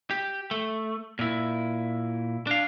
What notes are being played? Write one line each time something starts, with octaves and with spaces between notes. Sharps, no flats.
G4
A3
A#2 E4
D4 F5